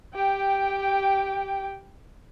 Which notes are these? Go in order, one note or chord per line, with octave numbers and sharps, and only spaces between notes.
G4 G5